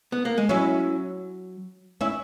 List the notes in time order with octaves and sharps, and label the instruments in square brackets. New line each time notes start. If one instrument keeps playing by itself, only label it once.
[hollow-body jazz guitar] B3
A#3
G#3
[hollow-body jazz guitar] F#3 [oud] C#4 E4
[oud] C#4 E4